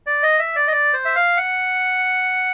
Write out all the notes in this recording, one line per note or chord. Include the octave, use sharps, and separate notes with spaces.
D5
D#5
E5
D5
D#5
D5
C5
E5
F5
F#5